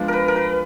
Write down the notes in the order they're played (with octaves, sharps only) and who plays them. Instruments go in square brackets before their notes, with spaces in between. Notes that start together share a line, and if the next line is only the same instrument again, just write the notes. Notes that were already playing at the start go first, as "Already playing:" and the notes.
Already playing: [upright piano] F3 G#3 B3 D4 F4
[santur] A#4 B4
A#4
B4